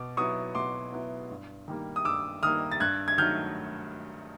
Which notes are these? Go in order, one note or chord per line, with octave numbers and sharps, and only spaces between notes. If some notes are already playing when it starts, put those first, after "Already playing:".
Already playing: B2 D6
F#3 B3 E4 C#6 D#6
B2 C6 D6
F#3 B3 E4
G2
D#3 G3 A#3
D#6
G2 D6 E6
D#3 G3 A#3 D#6 F6
A6
G2 F#6 G#6
G#6
D#3 F#3 A3 F6 G6